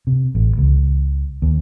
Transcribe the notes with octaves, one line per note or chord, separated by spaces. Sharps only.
C3
A1
C#2
D#2